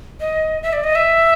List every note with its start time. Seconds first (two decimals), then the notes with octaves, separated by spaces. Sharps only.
0.20 D#5
0.63 E5
0.73 D5
0.84 D#5
0.95 E5